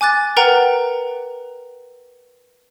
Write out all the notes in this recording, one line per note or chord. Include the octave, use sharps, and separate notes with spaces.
G#5 D6 F#6 A6
A#4 B4 F#5 G5 A#5